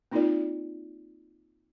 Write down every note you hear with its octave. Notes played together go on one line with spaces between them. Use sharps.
A#3 C4 D#4 F4 A#4 D5